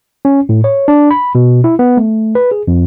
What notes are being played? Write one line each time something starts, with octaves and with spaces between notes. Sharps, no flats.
C#4
A2
C#5
D4
B5
B2
E4
B3
A3
B4
G#4
F2